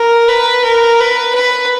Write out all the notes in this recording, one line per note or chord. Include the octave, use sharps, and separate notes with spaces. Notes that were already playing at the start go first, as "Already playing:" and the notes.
Already playing: A#4
B4
A#4
B4
B4